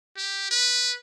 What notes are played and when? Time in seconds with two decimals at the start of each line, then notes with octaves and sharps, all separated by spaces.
0.17 G4
0.51 B4